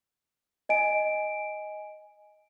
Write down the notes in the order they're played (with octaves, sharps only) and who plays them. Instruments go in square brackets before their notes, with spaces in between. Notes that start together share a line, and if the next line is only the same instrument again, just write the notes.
[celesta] D#5 G#5 D7